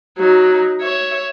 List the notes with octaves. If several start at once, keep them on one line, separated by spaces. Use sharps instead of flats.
F#3 D#4
C#5 E5